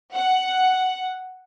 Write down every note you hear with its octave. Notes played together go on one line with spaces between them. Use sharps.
F#5